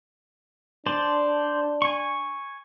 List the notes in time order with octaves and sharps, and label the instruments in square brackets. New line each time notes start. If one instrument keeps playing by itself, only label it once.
[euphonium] D4 [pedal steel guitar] C5 D5 A5
[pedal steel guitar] G#5 C#6